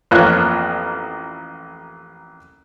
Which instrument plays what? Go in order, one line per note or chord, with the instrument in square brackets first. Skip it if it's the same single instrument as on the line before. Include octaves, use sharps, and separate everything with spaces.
[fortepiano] A1 F2 A#3 F4 C#5 F#6